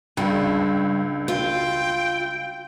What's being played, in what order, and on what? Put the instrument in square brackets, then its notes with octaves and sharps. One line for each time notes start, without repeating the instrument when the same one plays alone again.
[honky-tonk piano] C#2 [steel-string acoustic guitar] G2
[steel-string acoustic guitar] F4 [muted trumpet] G5